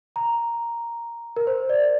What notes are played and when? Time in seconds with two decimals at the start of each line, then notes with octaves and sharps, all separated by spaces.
0.16 A#5
1.36 A#4
1.47 C5
1.69 D5